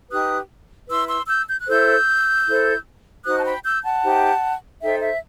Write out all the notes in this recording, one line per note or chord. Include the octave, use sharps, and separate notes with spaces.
D#4 G4 B4 D#6 F#6
E4 B4 C6 E6
C6 E6
E6 G6
G6
F#6
E4 A4 C5 E6 G6
E4 A4 C5
D#4 F#4 C5 D#6 F#6
A5
G5 B5
E6 G6
F#5 A5
D#4 G4 C5
D#4 A4 C5 E5 G5
E5